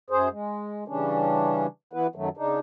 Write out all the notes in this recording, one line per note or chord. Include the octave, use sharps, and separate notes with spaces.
F#2 G#4 C5
G#3
C#3 E3 G3 C#4 D4
E3 B3 E4 B4
F#2 D#3 F#3 A3
C#3 D4 D#4